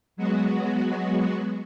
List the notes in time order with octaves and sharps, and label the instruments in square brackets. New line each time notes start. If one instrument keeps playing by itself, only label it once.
[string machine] F#3 G#3 B3 F#4